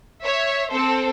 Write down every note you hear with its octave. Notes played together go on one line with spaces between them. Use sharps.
C#5 E5
C4 A4 C5